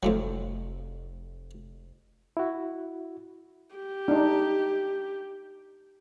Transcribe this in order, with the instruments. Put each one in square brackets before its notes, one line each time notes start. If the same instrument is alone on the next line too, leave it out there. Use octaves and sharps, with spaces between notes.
[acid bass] F1 [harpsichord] F2 A2 F#3
[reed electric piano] E4 F#4
[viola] G4
[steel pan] D4 D#4